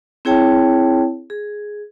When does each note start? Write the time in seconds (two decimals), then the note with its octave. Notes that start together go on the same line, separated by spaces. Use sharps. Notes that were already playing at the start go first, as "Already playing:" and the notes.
0.25 C4 E4 G#4 C#5 G5 A5
1.30 G#4